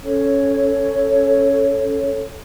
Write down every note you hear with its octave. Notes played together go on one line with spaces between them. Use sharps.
C#4 A4 C#5